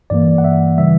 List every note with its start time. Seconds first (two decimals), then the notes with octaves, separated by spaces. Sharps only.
0.10 G2 E3 A#3 D5
0.38 F#5
0.44 E5
0.78 C#3 E3 G3 E5